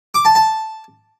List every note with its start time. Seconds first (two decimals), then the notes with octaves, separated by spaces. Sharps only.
0.15 D6
0.25 A5
0.35 A5